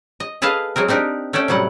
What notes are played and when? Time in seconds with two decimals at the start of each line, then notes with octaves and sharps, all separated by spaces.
0.20 D#5
0.42 G#4 A4 B4 D#5 F5 A5
0.76 F#3 G#3 C4 A#4
0.88 C4 D4 D#4 G4 A#4
1.33 A3 C#4 A4 D5 G5
1.48 A2 C3 F#3 G3 F#5